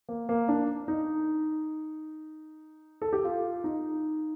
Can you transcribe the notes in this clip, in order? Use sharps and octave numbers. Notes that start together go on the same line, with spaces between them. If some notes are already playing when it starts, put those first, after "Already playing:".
A#3
A#3
D4
D#4
A4
G4
F4
D#4